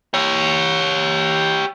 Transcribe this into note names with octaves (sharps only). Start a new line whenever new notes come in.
G4 C#5